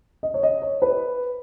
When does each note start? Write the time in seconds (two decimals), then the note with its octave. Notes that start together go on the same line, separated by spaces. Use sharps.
0.23 D#5
0.34 C#5
0.43 D#5
0.62 C#5
0.82 B4